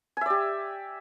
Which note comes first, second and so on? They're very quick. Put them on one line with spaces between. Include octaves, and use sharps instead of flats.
G#5 E5 D5 G4